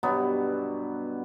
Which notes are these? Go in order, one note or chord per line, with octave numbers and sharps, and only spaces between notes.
G2 B2 F#3 B3